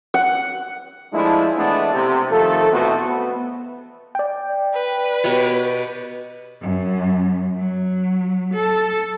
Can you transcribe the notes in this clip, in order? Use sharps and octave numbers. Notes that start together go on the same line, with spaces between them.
F#5
F3 G#3 A3 D4 E4
E3 G#3 A3 B3 D4
C3
D#3 F3 A3 A4
E2 B2 A3 B3 C4 F#4
B3
D5 G5
B4
B2 G4 C#5
F#2
F#3
A4